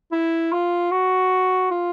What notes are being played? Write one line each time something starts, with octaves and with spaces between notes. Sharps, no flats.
E4
F4
F#4
F4